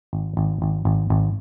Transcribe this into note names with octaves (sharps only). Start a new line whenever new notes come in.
G#1
G#1
G#1
G#1
G#1